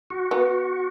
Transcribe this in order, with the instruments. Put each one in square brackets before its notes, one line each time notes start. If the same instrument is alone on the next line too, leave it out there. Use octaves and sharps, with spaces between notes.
[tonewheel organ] F#4
[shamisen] B3